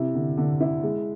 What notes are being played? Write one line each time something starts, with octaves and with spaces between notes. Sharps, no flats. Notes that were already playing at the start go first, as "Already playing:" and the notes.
Already playing: C3 E4
D3
D3
E4
G#3